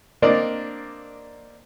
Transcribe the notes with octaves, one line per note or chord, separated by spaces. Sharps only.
A#3 C4 D4 A#4 D5 D#5